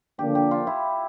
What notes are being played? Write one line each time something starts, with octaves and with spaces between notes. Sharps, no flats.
D3 F3 A#3 D4 G4
G4
F4
E4